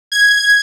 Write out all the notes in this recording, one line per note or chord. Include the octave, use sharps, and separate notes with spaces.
G#6